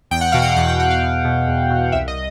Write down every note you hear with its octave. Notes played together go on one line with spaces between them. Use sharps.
E2 G5
F#5
B2 F5
F#5
E2 G5
G5
B2 F#5
F5
E2
B2
E2
B2
C2 E5
D#5